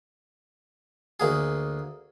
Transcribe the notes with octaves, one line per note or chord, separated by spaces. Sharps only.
D2 A#3 G#4